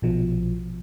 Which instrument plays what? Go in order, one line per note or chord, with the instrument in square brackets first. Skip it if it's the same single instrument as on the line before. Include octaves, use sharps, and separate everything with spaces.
[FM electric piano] A#1 B2 F3